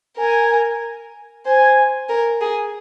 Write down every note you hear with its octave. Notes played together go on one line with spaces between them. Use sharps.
A#4 G#5
C5 G#5
A#4
G#4